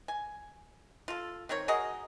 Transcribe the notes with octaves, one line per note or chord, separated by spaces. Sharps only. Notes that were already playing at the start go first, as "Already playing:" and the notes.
G#5
F4 A4
D#3 C4 A#4 C#5
F#4 G#4 A#4 D#5